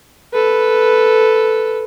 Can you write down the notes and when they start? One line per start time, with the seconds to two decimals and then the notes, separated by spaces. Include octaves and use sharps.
0.34 A4 B4